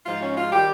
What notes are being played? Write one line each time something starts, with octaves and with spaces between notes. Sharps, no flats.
G#2 F3 G#3 F4
C#4
F4
D#3 G3 G4